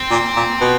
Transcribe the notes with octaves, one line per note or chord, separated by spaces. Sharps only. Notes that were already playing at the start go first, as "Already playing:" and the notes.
Already playing: C4
A#2
A#2
B2